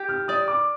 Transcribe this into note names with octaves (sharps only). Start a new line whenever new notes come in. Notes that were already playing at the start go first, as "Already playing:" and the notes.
Already playing: G4
F6
D5 D#6
D6